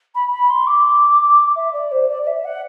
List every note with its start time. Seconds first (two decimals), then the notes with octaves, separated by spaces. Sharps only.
0.14 B5
0.31 B5
0.49 C6
0.67 D6
1.55 E5
1.73 D5
1.91 C5
2.08 D5
2.22 D5
2.27 E5
2.44 F#5